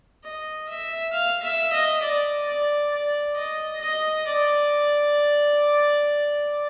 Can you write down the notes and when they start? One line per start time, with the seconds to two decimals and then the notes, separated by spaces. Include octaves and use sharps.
0.24 D#5
0.69 E5
1.13 F5
1.43 E5
1.73 D#5
2.02 D5
2.48 D5
2.93 D5
3.36 D#5
3.81 D#5
4.27 D5